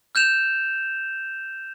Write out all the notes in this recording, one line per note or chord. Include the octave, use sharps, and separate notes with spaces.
F6 G6 E7 F7